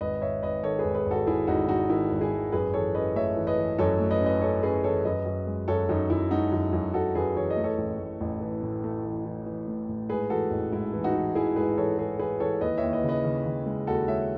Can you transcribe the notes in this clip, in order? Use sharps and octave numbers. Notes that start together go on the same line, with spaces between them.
G#1 B4 D#5
G#1 C#5 E5
G#1 B4 D#5
D#3 A4 C#5
G#4 B4
G#1
G#4 B4
G#1
F#4 A4
G#1 E4 G#4
G#1 D#4 F#4
G#1 D#4 F#4
D#3 E4
G#1
E4 G#4
G#1
F#2 G#4 B4
E3 A4 C#5
C#4 B4 D#5
A3 C#5 E5
E3
B4 D#5
E3
F#2 A4 C#5
A3
B4 D#5
C#4
B4 D#5
C#4 A4 C#5
C#4 G#4 B4
E3 A4 C#5
F#2 B4 D#5
F#2
G#3
F#2 A4 C#5
F#2 D#4
F#2 E4
G#3 D#4 F#4
F#2
F#2
F#2 F#4 A4
F#2 G#4 B4
E3 C#5
D#5
A3
A4 C#5
A1
A2
A1
E3
A2
A3
E3
E3
E3
A2
A2
G#2 G#4 B4
E3 F#4 A4
A1
G#2 E4
E3
D#4 F#4
E3
E3 E4 G#4
G#2 G#4 B4
E3 A4 C#5
E3 G#4 B4
E3 G#4 B4
E3 A4 C#5
D#2 B4 D#5
D#2 C#5 E5
B4 D#5
C#3
B4 D#5
C#3
C#3
G#3
D#2 F#4 A4
G#3 C#5 E5